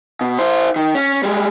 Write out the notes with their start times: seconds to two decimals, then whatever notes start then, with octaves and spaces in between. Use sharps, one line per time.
0.21 B2
0.39 E4 C5
0.76 D#3
0.95 C#4
1.23 G3 G#3